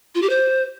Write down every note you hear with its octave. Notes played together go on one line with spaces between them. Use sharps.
F4
G4
C5